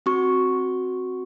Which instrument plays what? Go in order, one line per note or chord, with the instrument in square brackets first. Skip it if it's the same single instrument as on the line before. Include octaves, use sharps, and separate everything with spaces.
[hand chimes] C4 F#4 C#6